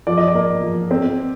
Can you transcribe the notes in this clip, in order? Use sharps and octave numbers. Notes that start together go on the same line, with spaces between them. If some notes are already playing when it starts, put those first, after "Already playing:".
F3 D5
D#5
D5
A#3
F3
C4